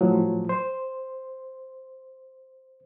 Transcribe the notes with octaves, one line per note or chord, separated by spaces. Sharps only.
A2 F3 F#3
C5